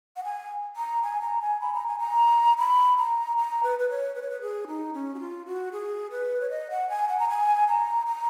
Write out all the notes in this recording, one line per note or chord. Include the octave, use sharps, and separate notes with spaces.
F#5
G#5
A#5
G#5
A#5
G#5
B5
A#5
G#5
A#5
B5
A#5
A#5
B4
B4
C#5
B4
C#5
B4
G#4
D#4
C#4
F#4
F4
F#4
G#4
B4
C#5
D#5
F#5
G#5
F#5
A#5
G#5
A#5
A#5